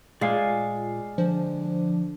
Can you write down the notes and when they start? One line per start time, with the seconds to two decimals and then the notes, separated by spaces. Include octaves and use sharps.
0.21 A#2 G#3 D5 F5 G#5
1.18 D3 F3